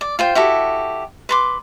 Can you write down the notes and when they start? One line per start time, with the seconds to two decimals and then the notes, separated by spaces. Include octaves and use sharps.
0.01 D5
0.19 F4 C5 G5
0.35 E4 F#4 G4 A4
1.29 B4 C6 D6